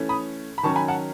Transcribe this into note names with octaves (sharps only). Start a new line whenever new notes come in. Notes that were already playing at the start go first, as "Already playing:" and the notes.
Already playing: E3 A3 C#4
B5 D#6
B5
D#3 F#3 C#4 A5 C#6
G#5 B5
F#5 A5